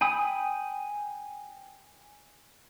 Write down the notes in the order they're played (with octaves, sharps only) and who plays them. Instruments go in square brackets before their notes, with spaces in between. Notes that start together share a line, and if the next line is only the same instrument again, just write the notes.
[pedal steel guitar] G5 G#5 B5 D#6